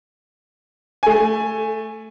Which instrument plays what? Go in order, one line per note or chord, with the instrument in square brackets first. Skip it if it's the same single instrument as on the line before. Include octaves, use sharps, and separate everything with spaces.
[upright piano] A3 G#5